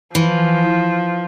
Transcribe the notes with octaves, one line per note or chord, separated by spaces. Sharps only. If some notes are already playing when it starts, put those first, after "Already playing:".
E3 F3